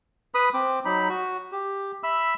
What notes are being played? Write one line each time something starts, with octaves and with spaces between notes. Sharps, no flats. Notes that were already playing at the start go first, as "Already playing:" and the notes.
B4 B5 D#6
C4 D6
F#3 D#4 B5
F#4
G4
E5 B5 E6